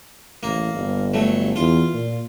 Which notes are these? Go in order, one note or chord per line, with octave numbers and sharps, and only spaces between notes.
A1 A#3
G1
F#3 A3
E2 F4
A#2